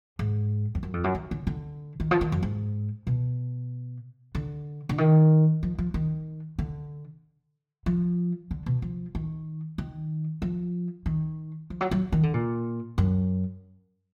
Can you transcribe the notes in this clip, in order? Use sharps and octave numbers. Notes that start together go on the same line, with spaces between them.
G#2
F2
F#2
F2
F#2
D#3
D3
D3
D#3
F3
D#3
F#2
G#2
B2
D3
D3
D#3
F3
F3
D#3
D3
F3
D3
B2
F3
D#3
D#3
F3
D#3
F3
F#3
F#3
D#3
D3
A#2
F#2